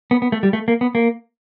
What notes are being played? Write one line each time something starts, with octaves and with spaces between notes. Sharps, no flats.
B3
B3
A3
G3
A3
A#3
B3
A#3